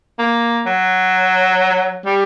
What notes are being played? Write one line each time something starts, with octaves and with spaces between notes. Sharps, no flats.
A#3
F#3
G3